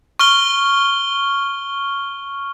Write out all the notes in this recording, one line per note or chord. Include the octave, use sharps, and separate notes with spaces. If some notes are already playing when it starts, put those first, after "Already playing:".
C#6 F6 G7